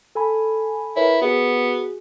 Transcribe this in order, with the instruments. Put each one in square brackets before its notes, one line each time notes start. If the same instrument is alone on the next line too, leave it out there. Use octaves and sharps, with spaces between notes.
[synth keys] A4 G#5 B5
[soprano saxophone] E4 [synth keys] A#4 B4 C#5
[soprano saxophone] B3 [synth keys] F#4 G#4